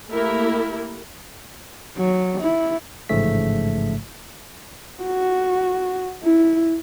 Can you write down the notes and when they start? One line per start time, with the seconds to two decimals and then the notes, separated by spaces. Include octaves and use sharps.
0.11 A3 A#3 E4 G4 A#4
1.98 F#3
2.41 E4
3.09 A1 G#2 C#3 F3 A3 B6
5.03 F#4
6.23 E4